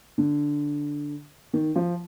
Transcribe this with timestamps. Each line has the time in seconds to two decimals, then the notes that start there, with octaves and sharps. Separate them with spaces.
0.18 D3
1.53 D#3
1.76 F3